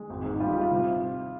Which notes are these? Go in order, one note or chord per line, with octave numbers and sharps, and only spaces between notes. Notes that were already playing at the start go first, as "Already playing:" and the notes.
Already playing: G#3
G#1
G#2
G3 F4
G4
G3
F4
C3